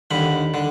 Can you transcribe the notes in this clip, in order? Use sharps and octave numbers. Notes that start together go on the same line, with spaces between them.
D#2 D3 B5
D3